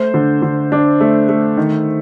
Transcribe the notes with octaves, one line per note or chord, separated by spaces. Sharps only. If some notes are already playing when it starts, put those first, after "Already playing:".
Already playing: A3 C5
D3
D3
D4
A3
A3
D#3